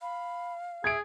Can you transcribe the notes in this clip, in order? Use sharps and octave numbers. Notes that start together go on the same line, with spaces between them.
F5 B5
G#4 E5 G#6 D7